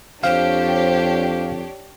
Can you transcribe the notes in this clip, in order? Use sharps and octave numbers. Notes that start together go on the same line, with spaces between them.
F2 D4 G4 C5 C#5 F5